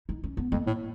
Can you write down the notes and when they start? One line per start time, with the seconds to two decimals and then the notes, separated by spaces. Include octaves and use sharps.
0.09 D#4
0.24 C#4
0.37 B3
0.52 F2 A#3
0.67 A2